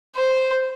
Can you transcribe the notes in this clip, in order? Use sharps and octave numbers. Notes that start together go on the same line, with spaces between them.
C5